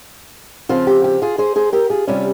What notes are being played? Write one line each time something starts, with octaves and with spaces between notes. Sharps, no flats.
C#3 F3 C4 F4
G4
G4
F4 G#4
G#4 C5
G#4 C5
G4 A#4
F4 G#4
C3 G3 C#4 F4 G4